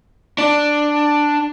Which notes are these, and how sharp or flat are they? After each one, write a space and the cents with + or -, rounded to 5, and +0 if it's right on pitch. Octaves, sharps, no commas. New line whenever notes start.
D4 +5